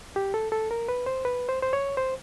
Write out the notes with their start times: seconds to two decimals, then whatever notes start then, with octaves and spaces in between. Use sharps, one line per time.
0.16 G4
0.34 A4
0.52 A4
0.71 A#4
0.89 B4
1.06 C5
1.25 B4
1.49 C5
1.62 C5
1.73 C#5
1.97 C5